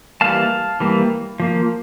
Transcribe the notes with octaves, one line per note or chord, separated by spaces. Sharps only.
E3 G3 A#3 F5 A5
E3 G3 A#3
F3 A#3